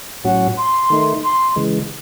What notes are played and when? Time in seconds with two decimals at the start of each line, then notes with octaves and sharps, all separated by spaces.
0.24 A2 F#3 C#4 F#4 F#5
0.57 C6
0.90 D#3 A3 D#4
1.24 C6
1.56 C#3 E3 G#3